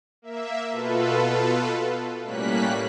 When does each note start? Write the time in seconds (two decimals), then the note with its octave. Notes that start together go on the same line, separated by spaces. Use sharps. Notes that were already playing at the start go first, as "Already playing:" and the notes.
0.22 A#3 E5
0.72 B2 F4 A4 B4
2.23 A2 G3 A#3 C#4 F#6 B6